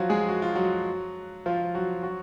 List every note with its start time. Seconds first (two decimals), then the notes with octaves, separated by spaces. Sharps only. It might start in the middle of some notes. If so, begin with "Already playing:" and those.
Already playing: F3 F#3 F4 F#4
0.10 G#3 G#4
0.28 F#4
0.42 F4
0.55 F#3 F#4
1.46 F3 F4
1.74 F#3 F#4
2.03 F#3 F#4